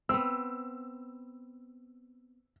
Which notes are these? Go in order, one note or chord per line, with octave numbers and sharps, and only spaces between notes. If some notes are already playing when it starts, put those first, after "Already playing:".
B3 C4 E6